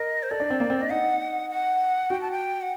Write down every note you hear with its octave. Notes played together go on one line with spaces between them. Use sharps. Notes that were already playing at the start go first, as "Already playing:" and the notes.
Already playing: A#4 D#5
C5
A4 D5
D4
C4
A#3
C4
D4 D#5
D#4 F#5
F#5
F#4 G5
A5
G5
F#5